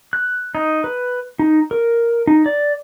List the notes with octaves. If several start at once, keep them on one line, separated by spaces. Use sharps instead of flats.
F#6
D#4
B4
D#4
A#4
D#4
D5